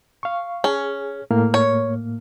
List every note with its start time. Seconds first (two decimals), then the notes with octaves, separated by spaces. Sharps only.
0.23 F5 C#6
0.64 C#4 G#4
1.31 A2 A#3 F6
1.54 C#5